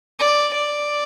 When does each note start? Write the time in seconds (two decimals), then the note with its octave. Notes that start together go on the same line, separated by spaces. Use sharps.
0.19 D5
0.54 D5